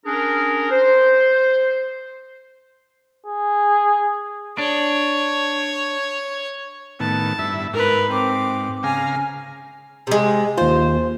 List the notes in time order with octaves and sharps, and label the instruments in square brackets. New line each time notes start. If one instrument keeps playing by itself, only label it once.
[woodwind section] C#4 D4 G#4 A#4
C5
[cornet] G#4
[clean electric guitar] D4 [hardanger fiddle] C#5
[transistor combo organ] A2 D#3 B3 [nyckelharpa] A5
[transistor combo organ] G2 E4 E5
[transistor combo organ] G#2 [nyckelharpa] A#4 B4
[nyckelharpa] C4 D6
[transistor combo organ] C#3 F5 A#5 [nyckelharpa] G#5
[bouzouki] C3 G#3
[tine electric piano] D#2 F4 [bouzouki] C5